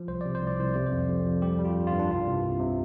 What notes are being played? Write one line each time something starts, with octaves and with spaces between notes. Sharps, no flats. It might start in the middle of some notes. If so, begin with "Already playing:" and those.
Already playing: F3
C2 C5
C3 D5
C5
C2
D5
C2 C5
C3 D5
C5
F2
F2
F2
G3 G4
G3
F4
G2
F4
G2
D4
C2 F4
C2
C3
C3